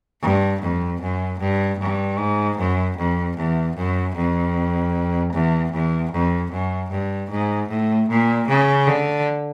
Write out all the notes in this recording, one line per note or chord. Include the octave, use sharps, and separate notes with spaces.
G2
F2
F#2
G2
G2
G#2
F#2
F2
E2
F#2
F2
E2
E2
F2
F#2
G2
G#2
A2
A#2
C#3
D3